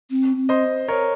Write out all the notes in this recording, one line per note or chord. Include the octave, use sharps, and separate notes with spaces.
C4
C4
C5 D#5
A#4 C#5